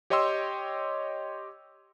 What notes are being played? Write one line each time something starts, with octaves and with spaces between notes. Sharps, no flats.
G4 C#5 D#5 G5 C6 E6